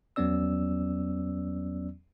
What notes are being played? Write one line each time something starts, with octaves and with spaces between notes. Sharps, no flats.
E2 F#3 B3 C#4 D5 E6